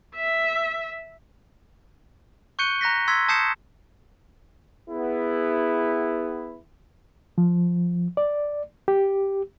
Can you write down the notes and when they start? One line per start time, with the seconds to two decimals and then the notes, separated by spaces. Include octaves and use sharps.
0.15 E5
2.59 C#6 F#6 G6 C#7 D#7 G7
2.81 A#5 F#6 A#6 B6
3.08 C6 E6 G#6 B6
3.28 A5 D#6 G6 C7 C#7 E7
4.89 B3 E4 G#4
7.38 F3
8.17 D5
8.88 G4